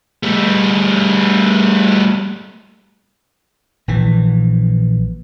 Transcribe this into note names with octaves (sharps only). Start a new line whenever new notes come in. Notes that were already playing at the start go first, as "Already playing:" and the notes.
G3 A3
A#1 E3